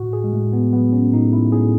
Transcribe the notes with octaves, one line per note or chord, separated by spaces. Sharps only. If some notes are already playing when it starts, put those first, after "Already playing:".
Already playing: A2 F#4
G#4
G#3
A2 A3
B3
F#3 B3
C#4
A2 D#4
E4
A2 G#4